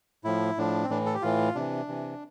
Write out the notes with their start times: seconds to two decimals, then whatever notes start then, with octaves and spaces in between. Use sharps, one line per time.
0.24 A2 F3 E4
0.57 A2 F3 D4
0.83 C4
0.90 A2 E3 D4
1.06 A4
1.14 G4
1.22 A2 E3 F4
1.55 C3 E3 D4
1.88 C3 E3